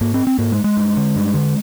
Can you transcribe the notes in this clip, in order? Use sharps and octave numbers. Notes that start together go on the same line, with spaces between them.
G#2 A#3
C4
C4
G#2 A#3
G#3
G#3
G2
D3
G2
D3